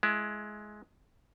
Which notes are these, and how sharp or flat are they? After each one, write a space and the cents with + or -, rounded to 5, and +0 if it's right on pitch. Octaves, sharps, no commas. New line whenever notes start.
G#3 +20 E4 +25